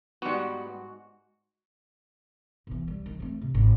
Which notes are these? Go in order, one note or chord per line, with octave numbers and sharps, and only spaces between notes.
G#2 G3 B3 F#4
B2 E3
G3
D#3
A3 C4
C3
G#1 E4